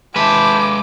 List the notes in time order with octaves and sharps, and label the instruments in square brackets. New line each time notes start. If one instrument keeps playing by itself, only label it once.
[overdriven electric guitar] G#3 B4 [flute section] E5 A5 G6 [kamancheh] D6